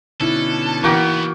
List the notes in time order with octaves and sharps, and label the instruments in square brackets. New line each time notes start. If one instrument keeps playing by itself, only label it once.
[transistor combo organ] B2 D3 C#4 [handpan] D#4 E4 [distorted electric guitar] A4
[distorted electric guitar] C#3 B3 [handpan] E3 E4 [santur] A#3 F#4 G5